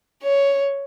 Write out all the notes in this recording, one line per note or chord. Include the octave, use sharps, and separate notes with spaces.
C#5